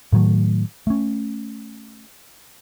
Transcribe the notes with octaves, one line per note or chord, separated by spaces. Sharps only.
A2 D#3 F#3 A3
A3 C#4